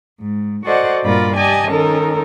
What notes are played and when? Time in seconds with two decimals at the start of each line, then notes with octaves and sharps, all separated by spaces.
0.20 G#2
0.65 F#4 A4 C5 D5 D#5 F#5
1.03 G2 A#2 F4 A#4 D5 B5
1.35 G4 D5 D#5 G#5 A5
1.67 D#3 C#4 D#4 A4 A#4